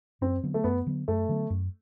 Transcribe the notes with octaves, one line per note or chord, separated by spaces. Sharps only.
F#2 C4
D3 F#3 B3
A3
F#2 B3
D3 F#3 B3
F#2 A3
D3 F#3 B3
F#2